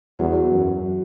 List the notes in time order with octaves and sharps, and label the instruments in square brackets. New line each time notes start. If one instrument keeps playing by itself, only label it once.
[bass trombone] E2 [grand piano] F#3
[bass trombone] F#2